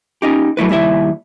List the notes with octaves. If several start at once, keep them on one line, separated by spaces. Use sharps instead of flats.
C#4 D#4 G4
F#3 A3 E4 B4
D#2 G3 E4 E5